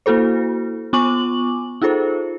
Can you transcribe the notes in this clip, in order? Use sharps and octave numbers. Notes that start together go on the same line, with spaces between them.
A#3 E4 F#4 A4 C5
B3 F4 G#5 C#6 D6 F#7
D#4 F4 G#4 A4 C5